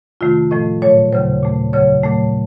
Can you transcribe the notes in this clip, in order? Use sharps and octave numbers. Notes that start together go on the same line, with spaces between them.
F2 C3 D#3 A3 F4
A2 F3 A3 D#5
A#2 F#3 A3 C#5
D#2 C#3 F#3 C5
A#2 A3
F2 C#3 F#3 C#5
A#2 F#3 A3